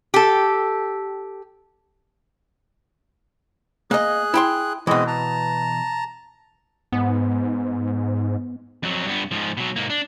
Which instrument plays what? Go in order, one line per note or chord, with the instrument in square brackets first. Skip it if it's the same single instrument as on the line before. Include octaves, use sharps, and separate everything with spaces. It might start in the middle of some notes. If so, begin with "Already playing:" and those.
[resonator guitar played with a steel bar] G4 A4
[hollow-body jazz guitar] A#3 D#5 [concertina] G#4 F#6
[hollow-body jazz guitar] E4 G5 C6
[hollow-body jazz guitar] B2 E3 [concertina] G#3 C4 D#5
[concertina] A5 A#5
[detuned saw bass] G#2 [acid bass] B3
[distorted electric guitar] F2 F#3
G2 B3
G#2 F3
B2 F#3
G#2 A#3
D4